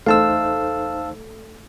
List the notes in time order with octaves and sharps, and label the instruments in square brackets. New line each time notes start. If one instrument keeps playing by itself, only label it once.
[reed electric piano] E2 D#4 C5 [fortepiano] A3 [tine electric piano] F5 A5 E6